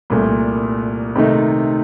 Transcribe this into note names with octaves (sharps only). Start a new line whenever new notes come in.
C2 A#2 A3
C3 D#3 A3 D#4